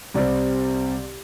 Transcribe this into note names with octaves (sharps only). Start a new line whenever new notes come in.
C2 C3 G3 C4 D5